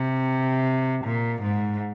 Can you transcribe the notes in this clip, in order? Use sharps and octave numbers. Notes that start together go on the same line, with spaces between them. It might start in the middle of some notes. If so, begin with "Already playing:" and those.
Already playing: C3
A#2
G#2